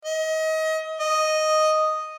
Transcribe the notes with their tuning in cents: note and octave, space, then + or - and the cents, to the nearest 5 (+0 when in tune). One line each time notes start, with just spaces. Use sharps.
D#5 +30
D#5 +0